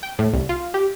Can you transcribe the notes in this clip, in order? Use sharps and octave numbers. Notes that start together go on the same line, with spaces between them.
G5
A2
C2
F4
G4